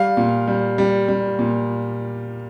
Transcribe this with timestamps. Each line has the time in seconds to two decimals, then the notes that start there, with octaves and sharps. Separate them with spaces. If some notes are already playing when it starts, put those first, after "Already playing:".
Already playing: G3 F5
0.17 A#2
0.48 G3
0.78 G3
1.08 G3
1.39 A#2